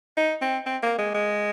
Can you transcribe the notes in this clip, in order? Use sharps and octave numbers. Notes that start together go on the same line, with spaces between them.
D#4
C4
C4
A#3
G#3
G#3